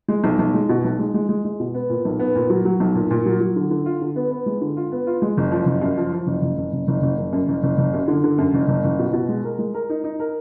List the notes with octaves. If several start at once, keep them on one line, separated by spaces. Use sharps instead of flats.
G#3
B1
B1
G#3
B2
B1
G#3
G#3
G#3
G#3
B2
B3
A#2
B1
B3
A#2
F#3
F#3
B1
A#2
A#2
F#3
F#3
D3
D3
F4
D3
B3
B3
G#3
D3
F4
B3
F4
G#3
F#1
F3
F#1
F#2
F3
F3
F#1
F#1
F#1
F#1
F#1
F#1
F#1
F#2
F#1
F#1
F#1
F#2
D3
D3
F#2
F#1
F#1
F#1
B2
B2
G#3
A#4
G#3
A#4
D#4
D#4
A#4